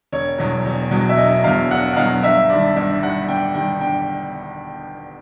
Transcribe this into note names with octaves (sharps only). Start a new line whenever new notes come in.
E1 C#5
E2 B2 F#3
E1
E2 B2 F#3
E5
E1 D#5
E2 B2 F#3 F5
E1 F#5
F#5
E2 B2 F#3 F5
G1 E5
G2 D#3 D5
G1 E5
G2 D#3 F#5
G1 G5
G2 D#3 G5
G1 G5